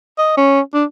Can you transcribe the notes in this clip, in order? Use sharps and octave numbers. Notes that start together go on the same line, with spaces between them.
D#5
C#4
D4